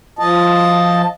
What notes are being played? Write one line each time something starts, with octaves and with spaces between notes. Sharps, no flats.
F3 D#5 A5